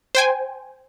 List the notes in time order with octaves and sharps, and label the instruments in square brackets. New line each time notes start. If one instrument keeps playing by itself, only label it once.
[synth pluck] C5 G5 G#5